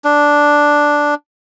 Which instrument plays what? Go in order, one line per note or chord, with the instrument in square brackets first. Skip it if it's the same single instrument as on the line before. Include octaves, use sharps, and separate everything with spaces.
[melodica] D4